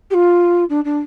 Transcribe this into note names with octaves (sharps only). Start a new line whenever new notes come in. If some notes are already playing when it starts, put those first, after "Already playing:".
G4
F4
D4
D4